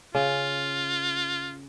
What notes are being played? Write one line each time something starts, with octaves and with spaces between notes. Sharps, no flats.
C#3 F4